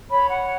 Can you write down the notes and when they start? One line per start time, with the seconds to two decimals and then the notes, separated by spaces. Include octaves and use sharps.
0.10 C#5 B5
0.28 F#5